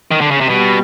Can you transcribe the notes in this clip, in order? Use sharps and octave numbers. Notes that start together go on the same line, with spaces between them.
D#3
D3
C#3
C3
B2 G3